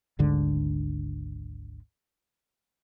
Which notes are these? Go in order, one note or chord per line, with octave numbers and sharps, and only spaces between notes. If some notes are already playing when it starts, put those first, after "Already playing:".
G#1 D2 G#2 D3